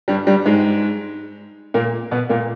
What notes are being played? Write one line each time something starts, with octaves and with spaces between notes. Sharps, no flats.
G2 G3
G2 G3
G#2 G#3
A#2 A#3
B2 B3
A#2 A#3